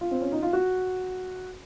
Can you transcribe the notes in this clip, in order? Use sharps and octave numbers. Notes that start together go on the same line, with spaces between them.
F4
C4
C#4
D#4
F4
F#4